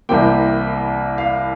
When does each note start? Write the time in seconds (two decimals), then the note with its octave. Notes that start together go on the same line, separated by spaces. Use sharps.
0.09 C2 C3 E3 A#3 G5
1.18 F5